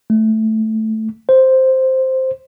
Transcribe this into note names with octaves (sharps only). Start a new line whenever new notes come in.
A3
C5